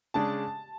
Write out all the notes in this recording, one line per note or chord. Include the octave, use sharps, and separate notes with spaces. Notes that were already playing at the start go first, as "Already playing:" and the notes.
C#3 G#3 D4 A5